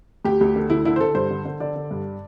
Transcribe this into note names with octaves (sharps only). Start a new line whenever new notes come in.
D2 G4
D2
D3
D2 E4
D3 E4
C5
D3 A4
G2 C5
D3
D3
D3 D5
D3
G2